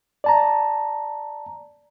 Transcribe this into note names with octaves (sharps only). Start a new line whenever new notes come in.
D5 A5 A#5